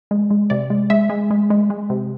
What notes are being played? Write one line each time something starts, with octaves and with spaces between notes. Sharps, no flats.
G#3
G#3
C3 D5
G#3
G#3 E5
G#3
G#3
G#3
G#3
C3